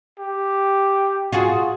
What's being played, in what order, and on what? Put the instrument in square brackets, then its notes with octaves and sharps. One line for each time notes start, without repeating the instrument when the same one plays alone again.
[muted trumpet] G4
[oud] F4 F#4 G#4